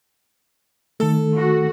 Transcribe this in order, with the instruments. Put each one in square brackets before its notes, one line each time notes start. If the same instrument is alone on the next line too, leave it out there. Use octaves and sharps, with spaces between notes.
[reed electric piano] D#3 A3 [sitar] A4
[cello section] F#4